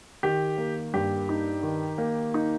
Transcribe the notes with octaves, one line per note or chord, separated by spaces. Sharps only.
D#3 G4
A#3
G2 G4
D#4
D#3
A#3
D#4